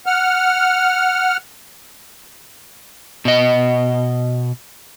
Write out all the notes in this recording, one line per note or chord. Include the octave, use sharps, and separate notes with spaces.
F#5 F6
B2 D#5